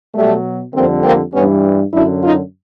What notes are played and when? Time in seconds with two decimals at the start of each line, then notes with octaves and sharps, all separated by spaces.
0.14 B2 F#3 G3 A3
0.74 F2 D3 G3 A#3 C4
1.04 A#3 C4
1.34 G2 E3 G3 B3 C#4
1.93 F#2 D3 F#3 D4 E4
2.23 D#4 F4